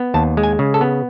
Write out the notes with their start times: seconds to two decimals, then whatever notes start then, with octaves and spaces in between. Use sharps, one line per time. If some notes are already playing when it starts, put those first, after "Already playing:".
Already playing: B3
0.14 D#2 A5
0.37 G#3
0.43 G#5
0.59 C#3
0.74 A4
0.81 B3